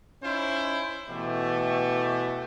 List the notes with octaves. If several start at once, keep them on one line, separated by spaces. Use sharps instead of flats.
C#4 D#4 E4 C5
B2 E3 A3 G4